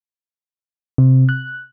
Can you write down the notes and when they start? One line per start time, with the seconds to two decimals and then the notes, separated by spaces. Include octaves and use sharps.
0.98 C3
1.29 F#6